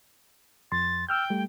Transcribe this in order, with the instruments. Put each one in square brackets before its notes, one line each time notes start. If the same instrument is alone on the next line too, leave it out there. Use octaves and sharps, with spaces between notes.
[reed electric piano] F2 C6 [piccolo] A6
[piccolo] G5 [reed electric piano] E6 F6 G6
[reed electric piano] G3 A3